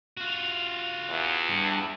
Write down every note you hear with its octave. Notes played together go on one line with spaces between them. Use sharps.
F4 F#4
E2
G2